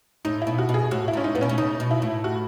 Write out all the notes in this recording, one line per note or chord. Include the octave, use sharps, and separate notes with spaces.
A2 D#4
E4
B2
F#4
B2
G#4
A2 F#4
E4
G#2 C#4
D#4
A2 B3
B2 C#4
A2
C#3 D#4
B2
E4
A2
F#4